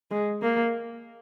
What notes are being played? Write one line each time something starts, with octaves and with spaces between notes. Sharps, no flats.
G#3
A#3